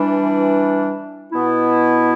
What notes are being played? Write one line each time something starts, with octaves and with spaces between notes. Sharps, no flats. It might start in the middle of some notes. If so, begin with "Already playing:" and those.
Already playing: E3 G3 D4
B2 B3 E4